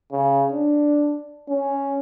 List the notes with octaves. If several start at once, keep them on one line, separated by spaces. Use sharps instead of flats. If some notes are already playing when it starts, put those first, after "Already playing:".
C#3
D4
C#4